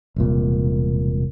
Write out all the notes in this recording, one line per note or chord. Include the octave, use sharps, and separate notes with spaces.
E1 C2 A#2